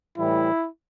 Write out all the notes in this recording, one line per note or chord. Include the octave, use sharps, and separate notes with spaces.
A2 E3 G3 E4